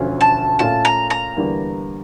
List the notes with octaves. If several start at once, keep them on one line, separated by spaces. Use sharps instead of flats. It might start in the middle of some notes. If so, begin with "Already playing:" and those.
Already playing: E1 D2 D3 F3 C#4
A5
A#2 A3 C#4 F4 A5
A#5
A#5
E2 D3 G3 A#3